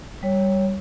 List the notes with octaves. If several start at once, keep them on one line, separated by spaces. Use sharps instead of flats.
G3 C#5